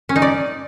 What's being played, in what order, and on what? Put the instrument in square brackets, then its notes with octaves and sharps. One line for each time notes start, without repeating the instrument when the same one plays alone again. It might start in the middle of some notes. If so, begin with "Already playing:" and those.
[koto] C#4
D#4
D5